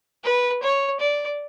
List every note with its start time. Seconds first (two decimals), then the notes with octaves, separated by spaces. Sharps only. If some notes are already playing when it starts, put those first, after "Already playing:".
0.24 B4
0.62 C#5
1.00 D5